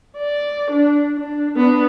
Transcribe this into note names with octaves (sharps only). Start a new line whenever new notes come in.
D5
D4
D4
B3 D4